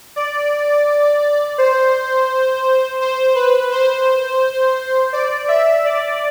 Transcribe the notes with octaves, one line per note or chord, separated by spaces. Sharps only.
D5
C5
C5
B4
C5
D5
E5
D5